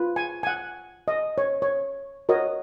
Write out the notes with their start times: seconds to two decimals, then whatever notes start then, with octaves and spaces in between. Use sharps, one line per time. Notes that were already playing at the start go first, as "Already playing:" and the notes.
Already playing: F4 B4
0.16 G#5
0.43 G#5
0.47 F#5
1.08 D#5
1.38 C#5
1.62 C#5
2.29 F#4 A#4 C#5 D#5